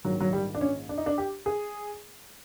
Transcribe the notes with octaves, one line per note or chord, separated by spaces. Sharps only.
A#1 G#2 D#3 F#3
F#3
G3
D4
C#4
D4
D#4
D4
G4
G#4